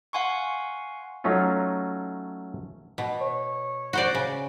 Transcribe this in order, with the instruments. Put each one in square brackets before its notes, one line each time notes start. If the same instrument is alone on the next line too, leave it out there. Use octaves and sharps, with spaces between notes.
[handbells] F5 F#5 G#5 C6 C#6
[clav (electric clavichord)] F#3 A3 C#4 D#4 F4
[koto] B2
[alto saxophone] C#5
[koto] F#4 C5 D5
C#3